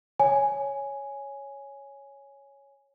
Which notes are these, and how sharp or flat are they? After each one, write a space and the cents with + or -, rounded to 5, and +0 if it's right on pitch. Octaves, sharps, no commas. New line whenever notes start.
C#5 +0 G#5 +0